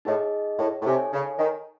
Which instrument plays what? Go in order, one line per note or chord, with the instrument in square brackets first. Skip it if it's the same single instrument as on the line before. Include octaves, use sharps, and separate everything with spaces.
[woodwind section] A2 [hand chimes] D#4 G#4 D#5
[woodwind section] A2
A2
[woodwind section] C3 [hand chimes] D#4 A4 C#5 G#5
[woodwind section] C#3
D#3